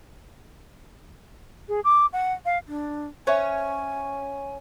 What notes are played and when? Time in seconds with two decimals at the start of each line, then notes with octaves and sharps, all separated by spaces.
1.69 G#4
1.84 D6
2.13 F#5
2.45 F5
2.68 D4
3.27 C#4 C5 C#5 E5 G#5